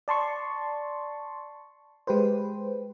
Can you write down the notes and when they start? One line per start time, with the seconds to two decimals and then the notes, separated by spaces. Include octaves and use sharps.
0.08 D5 A5 C6 C#6
2.07 G#3 G4 B4 C5